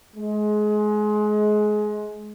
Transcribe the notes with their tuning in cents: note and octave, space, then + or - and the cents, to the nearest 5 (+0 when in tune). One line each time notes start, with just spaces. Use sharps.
G#3 +25